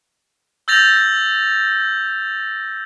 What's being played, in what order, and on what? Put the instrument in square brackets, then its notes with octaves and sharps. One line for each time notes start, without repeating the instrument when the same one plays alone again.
[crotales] E6 G6 A6 A#6 F7